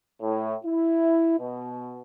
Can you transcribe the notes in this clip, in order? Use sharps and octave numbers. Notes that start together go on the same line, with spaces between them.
A2
E4
B2